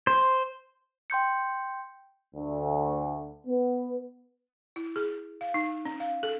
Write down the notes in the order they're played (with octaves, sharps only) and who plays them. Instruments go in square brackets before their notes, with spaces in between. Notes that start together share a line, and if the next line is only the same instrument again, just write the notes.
[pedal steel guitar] C5
[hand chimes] G5 C6 G6 C#7
[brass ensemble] D2
B3
[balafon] E4
G#4
F5
D#4
C#4
F5
A4